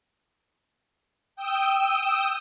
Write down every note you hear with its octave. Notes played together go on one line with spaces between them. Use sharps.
G5 D#6 E6